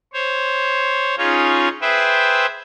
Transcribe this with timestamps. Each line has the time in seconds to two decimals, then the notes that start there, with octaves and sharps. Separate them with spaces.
0.13 C5 C#5
1.18 C#4 D#4 F4 G#4 C#5
1.81 G#4 B4 C5 E5 G5